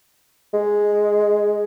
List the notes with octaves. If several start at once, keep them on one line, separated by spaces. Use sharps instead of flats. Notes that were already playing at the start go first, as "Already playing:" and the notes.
G#3